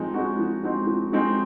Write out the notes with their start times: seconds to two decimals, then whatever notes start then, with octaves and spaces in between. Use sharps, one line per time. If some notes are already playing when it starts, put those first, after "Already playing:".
Already playing: F3 G#3 C4 D#4
0.14 G#3 C4 D#4 F#4
0.39 F3
0.63 G#3 C4 D#4 F#4
0.87 F3
1.12 G#3 C4 D#4 F#4